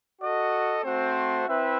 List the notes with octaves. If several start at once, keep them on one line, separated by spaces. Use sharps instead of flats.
F#4 A4 D#5
A3 C4 F#4 C5
C4 E4 B4 E5